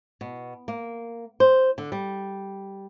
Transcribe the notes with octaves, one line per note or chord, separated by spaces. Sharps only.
B2
A#3
C5
D3
G3